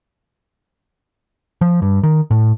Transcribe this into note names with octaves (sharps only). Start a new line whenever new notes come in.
F3
G2
D#3
A2